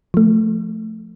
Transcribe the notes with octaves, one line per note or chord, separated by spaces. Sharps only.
F3 A3